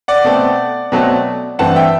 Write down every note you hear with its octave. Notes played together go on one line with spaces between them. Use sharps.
D5 F#5
B2 A3 C4
B2 F#3 A3 C4
G2 E3 A3 C4 F#5 A5
E5 G5